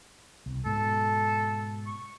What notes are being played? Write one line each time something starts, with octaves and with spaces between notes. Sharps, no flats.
C2
G#2 B2 A4
C#6